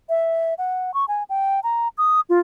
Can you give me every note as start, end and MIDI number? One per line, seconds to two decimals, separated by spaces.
0.09 0.54 76
0.58 0.94 78
0.94 1.05 85
1.08 1.23 80
1.29 1.60 79
1.64 1.88 82
1.98 2.20 87
2.30 2.39 65